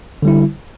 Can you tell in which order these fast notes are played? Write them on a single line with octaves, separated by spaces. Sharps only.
D3 G3 E4